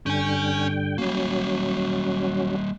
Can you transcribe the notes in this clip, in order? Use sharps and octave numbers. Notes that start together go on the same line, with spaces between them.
G2 D3 C#4 G5 G#5
F#3 G3 A#3 C#4